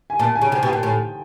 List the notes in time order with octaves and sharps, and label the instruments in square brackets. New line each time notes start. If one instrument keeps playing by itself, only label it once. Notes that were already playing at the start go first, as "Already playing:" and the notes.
[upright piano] G#5
[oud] A#2 [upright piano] A5
[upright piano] G#5
[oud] C#3
[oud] C3 [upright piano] G#5
[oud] B2 [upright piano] G5
[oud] A#2
[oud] A2 [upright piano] G#5